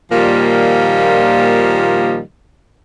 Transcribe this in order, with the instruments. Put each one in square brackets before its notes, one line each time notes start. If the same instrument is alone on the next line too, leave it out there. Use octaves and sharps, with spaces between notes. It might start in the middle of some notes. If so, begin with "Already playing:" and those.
[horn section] A#2 D#3 F3 G3 A#3